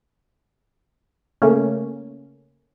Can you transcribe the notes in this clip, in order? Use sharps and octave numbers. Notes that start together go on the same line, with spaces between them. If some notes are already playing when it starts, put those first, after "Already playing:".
C#3 A3 A#3 C#4